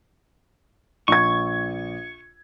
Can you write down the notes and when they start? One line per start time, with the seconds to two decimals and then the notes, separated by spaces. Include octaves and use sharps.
1.08 A#1 C#6 G#6